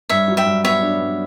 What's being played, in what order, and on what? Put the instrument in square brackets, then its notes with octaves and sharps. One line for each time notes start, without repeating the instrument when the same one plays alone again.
[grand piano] G2 [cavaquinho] C#5 E5
[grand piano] F#3
[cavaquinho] E5 G5
[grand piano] G2
[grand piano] B3 [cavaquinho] C#5 E5
[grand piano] D4
G2